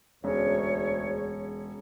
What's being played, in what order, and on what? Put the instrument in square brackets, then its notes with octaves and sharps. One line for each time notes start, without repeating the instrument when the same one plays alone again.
[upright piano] E1 [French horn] D2 [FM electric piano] C#4 G#4 [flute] C#5